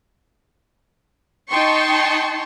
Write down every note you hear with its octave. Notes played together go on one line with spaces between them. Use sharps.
D#4 G5 A5 C6 C#6